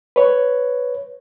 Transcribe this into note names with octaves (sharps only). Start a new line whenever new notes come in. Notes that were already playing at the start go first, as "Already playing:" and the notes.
B4 C#5